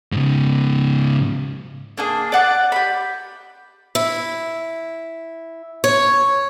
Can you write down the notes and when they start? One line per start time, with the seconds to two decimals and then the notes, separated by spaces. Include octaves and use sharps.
0.12 G#2 C#3
1.98 A#3 D4 G#4
2.32 D5 F#5 D6
2.72 G4 B5
3.95 E4
5.84 C#5